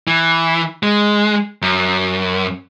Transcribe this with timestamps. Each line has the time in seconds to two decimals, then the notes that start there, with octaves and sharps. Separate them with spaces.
0.07 E3
0.83 G#3
1.62 F#2